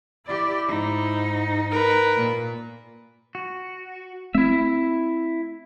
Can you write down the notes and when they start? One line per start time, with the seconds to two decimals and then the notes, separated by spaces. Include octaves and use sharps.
0.27 E4 G4 D5
0.68 G#2 D#4
1.71 A#4 B4
2.16 A#2
3.35 F#4
4.35 A3 C4 E4 E5